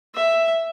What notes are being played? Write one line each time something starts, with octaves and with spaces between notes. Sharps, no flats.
E5